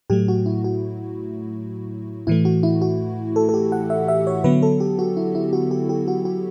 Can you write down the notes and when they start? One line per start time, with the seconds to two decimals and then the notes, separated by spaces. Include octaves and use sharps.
0.10 A2 F#3 A3 G4
0.28 F#4
0.46 E4
0.64 F#4
2.27 A2 E3 A3 E4
2.45 F#4
2.63 E4
2.82 F#4
3.36 A4
3.49 A4
3.54 G4
3.72 F#5
3.90 E5
4.08 E5
4.27 C#5
4.44 D3 F#3 B3 B4
4.63 A4
4.80 G4
4.99 F#4
5.17 E4
5.35 E4
5.53 F#4
5.71 G4
5.89 G4
6.08 F#4
6.25 F#4